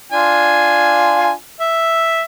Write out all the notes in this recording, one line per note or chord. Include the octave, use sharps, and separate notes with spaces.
D4 F4 G#5
E5